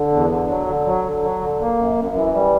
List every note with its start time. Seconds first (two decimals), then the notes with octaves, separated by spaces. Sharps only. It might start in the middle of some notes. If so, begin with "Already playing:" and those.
Already playing: D3
0.12 E2
0.30 D3
0.49 F#3
0.67 D3
0.86 F#3
1.04 D3
1.23 F#3
1.41 D3
1.60 A#3
1.78 F#2
1.97 F#2
2.15 E3
2.33 G3